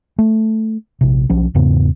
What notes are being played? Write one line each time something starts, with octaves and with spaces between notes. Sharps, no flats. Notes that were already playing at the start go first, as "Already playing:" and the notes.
A3
A#1 C3
B1 F3 C#4
E2 G#2 C#3 B3